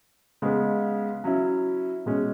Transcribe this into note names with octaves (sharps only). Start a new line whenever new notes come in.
C#3 G#3 B3
F#3 C#4 E4
B2 G#3 C#4